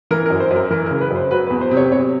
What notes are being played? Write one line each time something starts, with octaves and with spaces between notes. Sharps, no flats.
E3 A#4
A#4
F#2
C5
F#2
A#4
E3 A#4
A#4
C#3
B4
F#2
C5
F#3 B4
B4
E2
C5
C3
C#5
C3 C#5